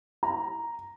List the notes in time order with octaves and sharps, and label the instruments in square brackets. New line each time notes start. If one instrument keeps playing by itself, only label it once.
[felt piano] A#5